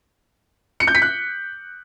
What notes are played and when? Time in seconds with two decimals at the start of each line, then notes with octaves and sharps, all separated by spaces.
0.80 C#7
0.87 G6
0.95 B6
1.02 F#6